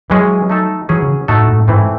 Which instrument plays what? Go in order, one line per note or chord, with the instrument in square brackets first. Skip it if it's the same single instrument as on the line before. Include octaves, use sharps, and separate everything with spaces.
[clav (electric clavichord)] E3 G#3 C#4 G#4 [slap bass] F#3
[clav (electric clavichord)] A3 D#4 A4
[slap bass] E3 [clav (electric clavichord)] F#3 C#4 G#4
[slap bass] C#3
[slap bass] A2 [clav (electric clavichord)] A3 D#4 F#4 A4
[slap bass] A2
[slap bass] G#2 [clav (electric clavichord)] E3 A3 C4